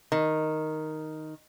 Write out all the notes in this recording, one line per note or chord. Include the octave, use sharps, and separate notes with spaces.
D#3